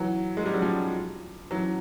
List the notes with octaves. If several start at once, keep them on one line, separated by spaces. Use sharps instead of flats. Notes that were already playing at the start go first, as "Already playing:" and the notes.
Already playing: E3 F#3
G#3
G3
F#3
F3 G3
E3 F#3